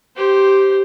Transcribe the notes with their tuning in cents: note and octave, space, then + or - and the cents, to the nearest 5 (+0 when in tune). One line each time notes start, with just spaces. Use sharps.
G4 -10 C5 +0